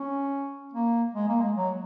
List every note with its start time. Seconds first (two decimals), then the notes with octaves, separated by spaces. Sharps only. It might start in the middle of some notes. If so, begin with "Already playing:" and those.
Already playing: C#4
0.74 A#3
1.14 G#3
1.28 A#3
1.41 G#3
1.55 F#3